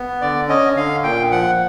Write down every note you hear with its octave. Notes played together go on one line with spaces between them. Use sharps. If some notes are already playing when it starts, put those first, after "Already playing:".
Already playing: B3
D3 D5
C#4 D#5
D3 F5
A#2 G5
F3 F#5